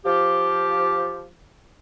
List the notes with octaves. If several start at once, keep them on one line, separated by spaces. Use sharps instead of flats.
F3 G4